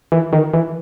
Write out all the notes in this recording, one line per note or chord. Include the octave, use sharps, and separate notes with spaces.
E3
D#3
E3